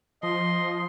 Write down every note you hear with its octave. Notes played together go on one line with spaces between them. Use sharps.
F3 D#5 C6